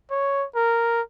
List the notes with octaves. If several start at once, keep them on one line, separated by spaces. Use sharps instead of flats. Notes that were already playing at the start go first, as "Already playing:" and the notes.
C#5
A#4